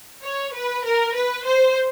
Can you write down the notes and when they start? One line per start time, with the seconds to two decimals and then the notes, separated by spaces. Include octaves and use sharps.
0.23 C#5
0.54 B4
0.85 A#4
1.15 B4
1.46 C5